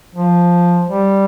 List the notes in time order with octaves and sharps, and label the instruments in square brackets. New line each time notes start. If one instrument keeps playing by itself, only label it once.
[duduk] F3
G3